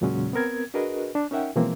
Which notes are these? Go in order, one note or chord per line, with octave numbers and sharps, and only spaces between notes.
E2 A#2 C#3 F#3 G#3 C#4
B3 C4 A#4 G#6
D4 F#4 G#4 A#4 B4 D#5
D4
C#4 D#4 A#4 E5 F#5 G5
B2 E3 F3 G#3 A#3 C4